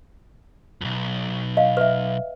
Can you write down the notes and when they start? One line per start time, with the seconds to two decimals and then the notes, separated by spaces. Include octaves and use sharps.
0.81 B1 F2
1.57 D#5 F5
1.77 B4 E5